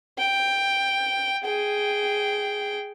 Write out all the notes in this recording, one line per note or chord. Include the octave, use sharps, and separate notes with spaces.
G5
G#4 G5